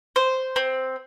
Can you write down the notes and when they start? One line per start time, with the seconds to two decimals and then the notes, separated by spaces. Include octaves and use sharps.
0.16 C5
0.56 C4